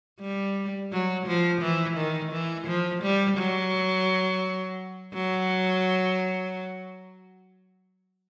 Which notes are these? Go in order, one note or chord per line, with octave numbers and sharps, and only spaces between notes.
G3
F#3
F3
E3
D#3
E3
F3
G3
F#3
F#3